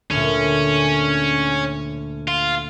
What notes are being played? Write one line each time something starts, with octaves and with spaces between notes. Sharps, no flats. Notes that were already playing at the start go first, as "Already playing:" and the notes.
D2 A#2 C#4
F4